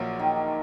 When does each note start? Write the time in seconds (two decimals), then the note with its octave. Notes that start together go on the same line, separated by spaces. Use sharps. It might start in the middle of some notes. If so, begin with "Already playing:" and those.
Already playing: A#1 A#2 F3 F#3 A#3
0.19 D#3